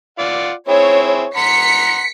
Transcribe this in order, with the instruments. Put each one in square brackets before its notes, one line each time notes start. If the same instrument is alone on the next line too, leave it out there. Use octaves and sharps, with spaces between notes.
[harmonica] F4 D5 F#5
[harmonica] C4 E4 G#4 [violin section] C#5
[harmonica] F#5 A#5 C6 [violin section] B6 C#7